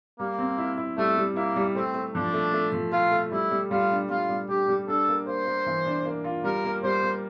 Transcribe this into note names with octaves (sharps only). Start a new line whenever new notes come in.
G3 A#3
C4
E4
E4
G3 A3
G3
A#3 E4
G3
A3 C4
A3
F3 D4
A3
A3
F3
A3 F4
A3
G3 E4
G3
G3 F4
D4
G3 F4
G3
D4 G4
G3
D4 A4
A#3
A#3 C5
A#3
E3
D4
A#3
F4
G3 A#4
A#3
G3 C5
A#3